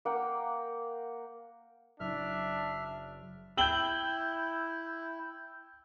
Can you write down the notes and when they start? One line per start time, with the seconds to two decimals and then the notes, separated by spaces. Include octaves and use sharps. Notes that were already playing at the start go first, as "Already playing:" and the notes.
0.05 A#3 F#5 G5
2.00 F#1 D4 E5 F6
3.57 E4 G5 E6 G6 F#7 G7